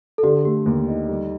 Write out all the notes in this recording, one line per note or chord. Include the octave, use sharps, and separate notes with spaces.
A4
D3 G4
A3 G4
D#2
D#4
G3